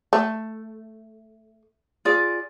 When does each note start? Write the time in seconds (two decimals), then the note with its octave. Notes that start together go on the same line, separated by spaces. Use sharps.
0.13 A3
2.05 F4 G#4 D5